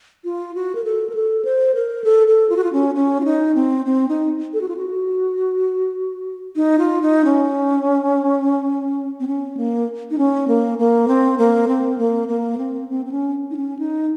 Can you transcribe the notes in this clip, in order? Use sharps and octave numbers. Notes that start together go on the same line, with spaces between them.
F4
F#4
A#4
A4
A#4
A4
C5
A#4
A4
A4
F4
F#4
F4
C#4
C#4
F4
D#4
C4
C4
D#4
A4
F#4
F4
F#4
D#4
F4
D#4
C#4
C4
C#4
A#3
D#4
C#4
A#3
A#3
C4
A#3
C4
A#3
A#3
C4
C4
C4
C#4
D#4
C#4
D#4